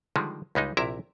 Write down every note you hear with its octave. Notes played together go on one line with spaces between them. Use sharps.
D3 D#3 F3 G3 G#3
C#2 G3 G#3 D#4
A#1 C3 E4 A#4 E5 A#5